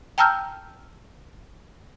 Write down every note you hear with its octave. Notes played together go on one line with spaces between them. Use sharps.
G5 A5 A#5 E6 F6 G6